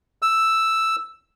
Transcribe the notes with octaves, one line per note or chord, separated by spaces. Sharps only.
E6